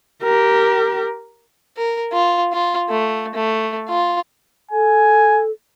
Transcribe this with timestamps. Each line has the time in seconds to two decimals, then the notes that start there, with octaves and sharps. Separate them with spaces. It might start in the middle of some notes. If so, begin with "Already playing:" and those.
0.23 G4 A#4
1.77 A#4
2.12 F4
2.53 F4
2.89 A3
3.35 A3
3.89 F4
4.72 A4 G#5